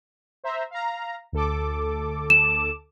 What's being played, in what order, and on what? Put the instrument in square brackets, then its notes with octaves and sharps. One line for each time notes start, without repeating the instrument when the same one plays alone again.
[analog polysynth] C5 E5 A#5
F5 A#5
D2 A4 D6
[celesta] E7